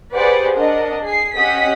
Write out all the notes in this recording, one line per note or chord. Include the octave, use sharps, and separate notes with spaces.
G4 G#4 B4 C5 D5 F#5
D4 A#4 D#5 F#5
G#4 C7
C#4 G4 D#5 F#5 D#6 B6